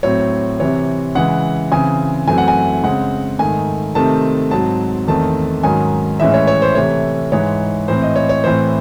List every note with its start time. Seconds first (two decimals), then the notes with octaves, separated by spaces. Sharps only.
0.03 A2 F#3 C4 C#5
0.60 C3 E3 C4 C#5
1.15 C#3 E3 G#3 F#5
1.72 C#3 E3 C4 G#5
2.27 F#2 E3 A3 C4 G#5
2.38 F#5
2.48 G#5
2.84 C#3 G#3 C4 F#5
3.39 G#2 D#3 A3 G#5
3.95 C3 D#3 A3 C4 A5
4.51 G#2 F#3 C4 A5
5.07 E2 D#3 A3 C4 A5
5.63 G#2 D#3 F#3 C#4 G#5
6.20 A2 E3 G#3 C#4 E5
6.34 C#5
6.47 C#5
6.62 C5
6.75 C3 E3 A3 C#5
7.32 G#2 E3 G#3 C#5
7.88 A2 E3 C4 C5
8.02 D#5
8.16 C#5
8.29 C#5
8.44 A2 E3 C4 C5